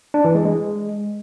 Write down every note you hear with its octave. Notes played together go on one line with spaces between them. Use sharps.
D4
E3
G#3
G#3